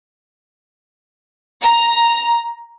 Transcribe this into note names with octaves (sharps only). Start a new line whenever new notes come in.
A#5